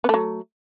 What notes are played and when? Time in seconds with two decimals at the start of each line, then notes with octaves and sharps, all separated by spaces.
0.04 B3
0.09 A3
0.14 F#3